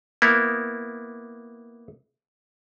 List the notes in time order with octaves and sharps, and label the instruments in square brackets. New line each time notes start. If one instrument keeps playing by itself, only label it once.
[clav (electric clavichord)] A#3 B3 E4